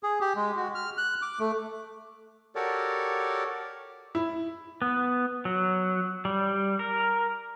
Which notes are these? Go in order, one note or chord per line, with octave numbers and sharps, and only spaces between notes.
G#4
G4
G#3
F#4
F6
F#6
D6
A3
F#4 G4 A4 A#4 C#5 D5
E4
B3
F#3
G3
A#4